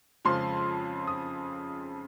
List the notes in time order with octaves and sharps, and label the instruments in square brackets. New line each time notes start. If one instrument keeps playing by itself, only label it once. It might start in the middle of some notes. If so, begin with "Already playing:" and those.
[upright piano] F2 C#3 F3 G#3 C6
D#6